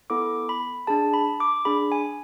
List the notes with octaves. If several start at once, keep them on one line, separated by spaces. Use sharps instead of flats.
B3 E4 A4 D6
B5
D4 G#4 A5
B5
D6
D4 G#4 B5
G#5